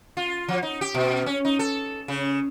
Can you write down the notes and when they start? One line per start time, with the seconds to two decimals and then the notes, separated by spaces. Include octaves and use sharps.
0.17 F4
0.48 F3
0.63 D#4
0.81 G4
0.95 B2
1.26 C#4
1.45 D#4
1.59 A4
2.08 C#3